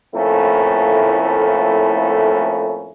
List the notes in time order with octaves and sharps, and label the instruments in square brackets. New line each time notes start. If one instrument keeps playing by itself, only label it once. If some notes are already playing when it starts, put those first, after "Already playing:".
[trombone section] F2 A2 A3 A#3 C#4 E4